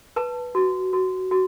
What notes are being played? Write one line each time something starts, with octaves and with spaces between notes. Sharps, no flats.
B4 A5
F#4
F#4
F#4